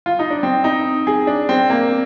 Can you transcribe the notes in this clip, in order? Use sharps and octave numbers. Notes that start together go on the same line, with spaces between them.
F4
D#4
D4
C4
D#4
G#4
D4
C4
A#3